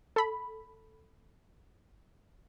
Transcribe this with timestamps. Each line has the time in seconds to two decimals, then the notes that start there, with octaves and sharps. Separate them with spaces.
0.16 A4 B5